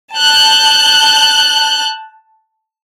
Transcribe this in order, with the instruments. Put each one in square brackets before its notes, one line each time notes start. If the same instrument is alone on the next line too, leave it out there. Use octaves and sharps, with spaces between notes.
[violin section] A5 F#6 G6